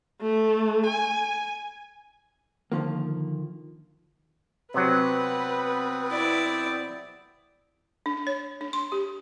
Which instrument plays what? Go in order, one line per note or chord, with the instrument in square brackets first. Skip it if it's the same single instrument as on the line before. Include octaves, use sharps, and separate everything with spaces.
[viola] A3
G#5
[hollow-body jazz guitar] D3 D#3 F3 A#3
[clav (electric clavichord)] C3 F#3 [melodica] B3 C4 [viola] B4
[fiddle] E4 D5
[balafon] D4
C#5
D4
C6
G4